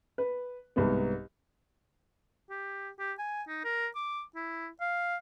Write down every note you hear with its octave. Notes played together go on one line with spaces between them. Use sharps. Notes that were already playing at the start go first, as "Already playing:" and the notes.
B4
C2 G#2 B3
G4
G4
G#5
D#4
A#4
D6
E4
F5